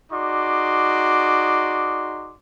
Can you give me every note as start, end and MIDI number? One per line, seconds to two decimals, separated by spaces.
0.12 2.34 63
0.12 2.34 66
0.12 2.34 68
0.12 2.34 74
0.12 2.34 84
0.12 2.34 86